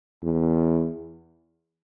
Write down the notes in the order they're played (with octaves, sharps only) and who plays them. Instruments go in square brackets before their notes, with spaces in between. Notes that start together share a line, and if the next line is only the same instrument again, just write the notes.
[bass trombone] E2